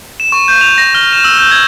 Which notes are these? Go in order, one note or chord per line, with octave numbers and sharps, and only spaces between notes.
E7
C#6
G6
F7
A#6
F6
E7
E6
G6
G#6